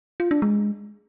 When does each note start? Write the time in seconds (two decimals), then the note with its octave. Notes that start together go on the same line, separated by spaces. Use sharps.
0.20 F4
0.31 D4
0.42 G#3